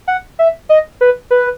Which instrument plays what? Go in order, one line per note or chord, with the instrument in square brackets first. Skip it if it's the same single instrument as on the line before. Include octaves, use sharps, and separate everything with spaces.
[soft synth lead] F#5
E5
D#5
B4
B4